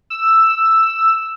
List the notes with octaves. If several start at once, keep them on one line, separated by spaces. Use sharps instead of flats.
E6